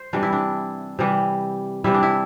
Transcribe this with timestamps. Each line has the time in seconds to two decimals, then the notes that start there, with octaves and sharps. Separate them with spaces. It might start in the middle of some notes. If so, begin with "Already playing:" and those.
Already playing: C5
0.13 C3 E3 G3 D4
0.23 E4
0.33 D4
0.99 C3 E3 G3
1.84 C3 E3 G3 E4
1.94 D4
2.03 E4